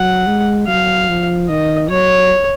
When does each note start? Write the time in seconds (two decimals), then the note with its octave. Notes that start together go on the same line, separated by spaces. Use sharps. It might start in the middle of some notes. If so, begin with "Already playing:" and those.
Already playing: F#3 F#5
0.27 G#3
0.67 F#3 F5
1.08 F3
1.49 D#3 D#5
1.89 F#3 C#5